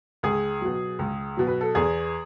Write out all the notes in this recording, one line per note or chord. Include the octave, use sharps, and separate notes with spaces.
C#2 G#4
B2 F#3
C#2
B2 F#3
B4
A4
E2 G#4